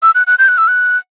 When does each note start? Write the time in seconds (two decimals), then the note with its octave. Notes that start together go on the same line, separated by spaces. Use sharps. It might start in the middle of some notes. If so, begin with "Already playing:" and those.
0.03 E6
0.15 F#6
0.27 F#6
0.39 G6
0.48 F#6
0.58 E6
0.68 F#6